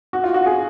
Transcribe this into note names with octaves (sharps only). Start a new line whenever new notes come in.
F#4
F4
F#4
G#4